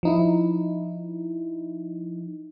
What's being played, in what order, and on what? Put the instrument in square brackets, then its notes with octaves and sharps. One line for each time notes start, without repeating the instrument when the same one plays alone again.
[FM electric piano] F3 D#4 E4